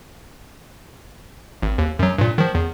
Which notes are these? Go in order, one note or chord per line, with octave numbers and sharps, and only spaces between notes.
G#1
D#2
F#2 F#3
G2 A#2
D#3 F3
E2